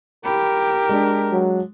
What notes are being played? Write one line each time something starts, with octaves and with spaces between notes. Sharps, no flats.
G4 A#4 B5
G#3 D4
F#3